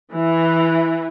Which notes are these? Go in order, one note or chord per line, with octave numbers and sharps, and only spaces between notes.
E3